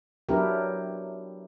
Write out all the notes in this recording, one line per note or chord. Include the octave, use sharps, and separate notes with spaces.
F#3 B3 D4 E4 G4 A#4